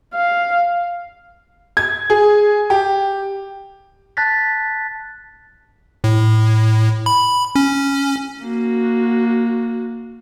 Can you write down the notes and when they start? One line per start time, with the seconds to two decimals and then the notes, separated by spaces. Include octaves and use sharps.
0.15 F5
1.77 G#6
2.10 G#4
2.70 G4
4.17 A5 F#6 A6 B6
6.04 A2
7.06 B5
7.56 C#4
8.42 A#3 F#4